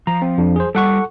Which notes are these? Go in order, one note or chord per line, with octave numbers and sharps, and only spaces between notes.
F3 A#5
C4
F2 D4
G#4 C5
G3 F4 A4 F#5 C#6